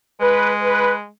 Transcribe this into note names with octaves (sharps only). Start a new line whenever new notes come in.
G#3 B4
B4